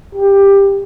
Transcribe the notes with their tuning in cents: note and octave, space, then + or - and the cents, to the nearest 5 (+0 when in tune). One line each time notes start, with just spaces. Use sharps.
G4 +15